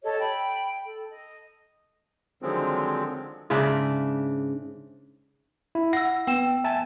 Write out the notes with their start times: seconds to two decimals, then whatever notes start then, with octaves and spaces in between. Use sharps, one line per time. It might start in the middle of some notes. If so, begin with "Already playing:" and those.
0.03 G4 A4 C#5 D#5
0.19 G5 B5
0.85 A4
1.10 D#5
2.42 D3 D#3 F3 F#3 G#3 C4
3.50 G#2 C#3 D4 E5
5.75 E4
5.93 F#5 E6 A#6
6.27 B3 G5 E6 E7
6.64 E5 G#5 A5